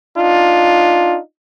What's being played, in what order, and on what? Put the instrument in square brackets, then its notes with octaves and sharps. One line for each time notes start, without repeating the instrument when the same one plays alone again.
[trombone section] D4 D#4 F4